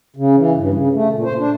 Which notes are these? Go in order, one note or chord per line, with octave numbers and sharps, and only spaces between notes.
C#3
E3
G2
C#3
A3
A#2
C5
D4